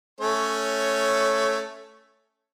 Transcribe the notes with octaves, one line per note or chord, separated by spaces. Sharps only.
A3 C#4 C#5